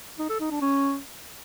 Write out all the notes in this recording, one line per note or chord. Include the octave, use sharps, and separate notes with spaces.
D#4
A4
D#4
D4
C#4